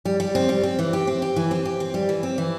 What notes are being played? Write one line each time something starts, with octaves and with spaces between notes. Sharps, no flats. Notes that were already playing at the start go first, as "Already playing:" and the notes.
G3
G3
C4
G3
C4
E3
G4
C4
G4
E3
C4
G4
C4
G3
E3
C4
E3